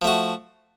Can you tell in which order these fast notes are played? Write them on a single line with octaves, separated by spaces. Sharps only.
F3 A3 F#4